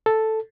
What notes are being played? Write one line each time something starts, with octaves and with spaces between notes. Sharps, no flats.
A4